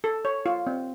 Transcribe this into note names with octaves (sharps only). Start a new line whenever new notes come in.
A4
C#5
F4
C4